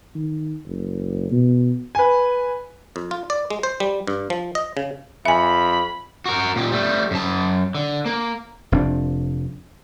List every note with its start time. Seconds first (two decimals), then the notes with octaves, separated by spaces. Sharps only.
0.15 D#3
0.65 F#1
1.31 B2
1.95 B4 G#5
2.96 F2
3.11 F4
3.30 D5
3.50 G#3
3.63 C5
3.80 G3
4.07 G2
4.30 F3
4.55 D#5
4.77 C#3
5.25 F2 E5 G#5 B5
6.26 F#4 A#4
6.56 A#2 G4
6.72 G3 A3
7.11 F#2 A5
7.75 D3
8.06 A#3
8.72 F1 C4 D4